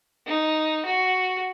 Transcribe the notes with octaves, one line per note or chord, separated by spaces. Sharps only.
D#4
F#4